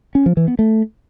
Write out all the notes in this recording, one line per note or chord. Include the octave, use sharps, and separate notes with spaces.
C#4
F3
E3
B3
A3